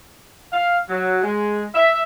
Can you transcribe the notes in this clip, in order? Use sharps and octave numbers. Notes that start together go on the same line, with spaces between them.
F5
F#3
G#3
E5